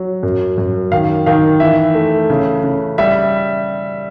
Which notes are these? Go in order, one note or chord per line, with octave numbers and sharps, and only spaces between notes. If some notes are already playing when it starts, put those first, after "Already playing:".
Already playing: F#3
F#2
F#2
D#3 F5
D#3 F5
E3 E5
A3
C#3
C#3
G3 E5